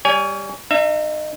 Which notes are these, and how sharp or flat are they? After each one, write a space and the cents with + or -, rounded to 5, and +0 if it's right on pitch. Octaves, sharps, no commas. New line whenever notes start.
G3 +10 C#5 +35 G#5 -5
D#4 -30 E5 +30